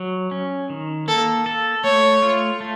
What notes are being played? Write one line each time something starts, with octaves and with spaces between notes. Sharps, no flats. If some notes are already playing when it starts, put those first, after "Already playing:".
Already playing: F#3
C#4
D#3
A#3 A4
A4
A3 C#5
F4
A3